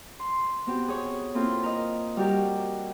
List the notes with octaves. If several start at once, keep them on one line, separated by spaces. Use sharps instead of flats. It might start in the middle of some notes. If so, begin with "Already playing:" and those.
C6
B3 C4 F#4 G4
G#4 C#5 C#6
A#3 C4 E4 F4 A4
A#4 D#5
G3 F#4 G4 A#4